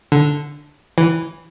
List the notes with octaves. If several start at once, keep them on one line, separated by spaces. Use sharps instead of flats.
D3
E3